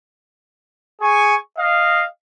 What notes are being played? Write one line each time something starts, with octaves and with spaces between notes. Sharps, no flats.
G#4 G#5 C#6
D#5 F5